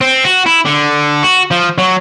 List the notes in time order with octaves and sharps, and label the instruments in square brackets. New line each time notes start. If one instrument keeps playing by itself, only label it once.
[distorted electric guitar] C4
F#4
E4
D3
F#4
F3
F#3